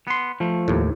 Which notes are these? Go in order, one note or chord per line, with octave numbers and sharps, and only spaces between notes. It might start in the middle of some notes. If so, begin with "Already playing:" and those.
B3 C6
F3 A3
D#2 A2